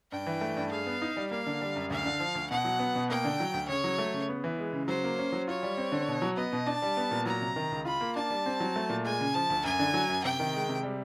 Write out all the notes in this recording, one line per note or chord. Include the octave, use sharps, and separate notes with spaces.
G2 G5
E3
A3
G2
G#4 F5
B3
D#4
G3
A#3 F5
D3
G3
F#2
D2 F5
D3
F3
D2
B2 F#5
F#3
B3
B2
A#3 G5
D3
F#3
D2
C#3 C#5
F#3
A3
C#3
B3
E3
G#3
C#3
F#3 C5
A#3
C#4
F#3
F4 C#5
G3
C4
D3
B2
F#3
B3 D#5
B2
D4 A5
G3
B3
A#2
F#3 A#5
C3
D#3
C#2
F4 B5
A#3
D4 A5
G3
C4
F#3
A3
A#2
G#3 G#5
C#3
F3 A5
D2
F#2 G#5
D3
F#3
F#2
C3 G5
D#3
G#3
C3
G3